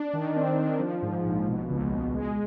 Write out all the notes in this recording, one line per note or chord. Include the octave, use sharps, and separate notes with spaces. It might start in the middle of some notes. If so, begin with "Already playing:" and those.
Already playing: D4
D#3
C4
D#3
F3
G#2
A#1
B2
C#2
B2
G#3